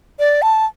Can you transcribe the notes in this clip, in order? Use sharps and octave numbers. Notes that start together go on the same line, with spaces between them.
D5
A5